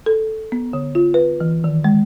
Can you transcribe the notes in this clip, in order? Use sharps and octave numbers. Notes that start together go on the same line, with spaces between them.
A4
B3
D3
F4
B4
E3
D#3
G#3